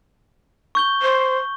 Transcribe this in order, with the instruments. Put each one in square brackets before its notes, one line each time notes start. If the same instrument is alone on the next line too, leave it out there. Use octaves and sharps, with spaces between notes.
[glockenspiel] C#6 G6 G7
[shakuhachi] C5